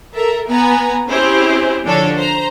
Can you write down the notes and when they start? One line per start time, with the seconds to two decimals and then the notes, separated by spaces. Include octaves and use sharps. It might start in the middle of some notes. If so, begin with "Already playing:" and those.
0.15 A4 A#4 E5
0.48 B3 B4 G#5 A#5
1.08 C4 C#4 E4 G4 G#4 C5
1.84 D3 F3 D4 A4 C#5
2.17 C5 A#5